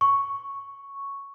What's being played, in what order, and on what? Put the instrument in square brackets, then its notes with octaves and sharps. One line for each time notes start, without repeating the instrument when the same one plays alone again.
[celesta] C#6